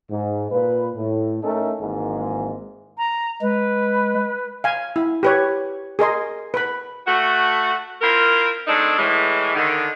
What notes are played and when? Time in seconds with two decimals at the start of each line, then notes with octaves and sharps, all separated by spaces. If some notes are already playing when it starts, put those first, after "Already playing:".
0.10 G#2
0.51 A#2 F4 B4
0.96 A2
1.43 A3 C#4 D#4 A4 A#4
1.80 G#1 G#2 E3 G#3 A#3
2.98 A#5
3.41 G#3 B4
4.64 F5 G#5
4.96 E4
5.23 G4 B4 C#5
5.99 G#4 A#4 D#5 C6
6.54 B4 B5
7.06 A3 F#4
8.01 C4 E4 F4 A#4
8.67 G#3 A3 C4 D4 D#4 A4
8.98 A2 E3 G#3
9.54 D3 D#3